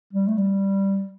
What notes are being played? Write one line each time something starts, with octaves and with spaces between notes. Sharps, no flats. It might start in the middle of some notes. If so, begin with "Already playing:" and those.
G3
A3
G3